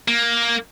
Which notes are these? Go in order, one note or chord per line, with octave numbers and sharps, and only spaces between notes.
A#3